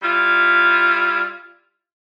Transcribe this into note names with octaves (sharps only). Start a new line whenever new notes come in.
G3 E4 F4